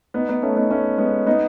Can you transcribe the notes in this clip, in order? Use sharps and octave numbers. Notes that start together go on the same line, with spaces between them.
B3 D#4
B3 D#4
A3 C#4
B3 D#4
A3 C#4
G#3 B3
B3 D#4